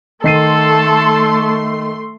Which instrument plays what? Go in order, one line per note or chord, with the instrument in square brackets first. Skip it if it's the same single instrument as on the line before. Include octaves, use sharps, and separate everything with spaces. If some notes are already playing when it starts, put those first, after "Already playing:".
[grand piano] D#3 C7 D#7 [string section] A3 C6 [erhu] A4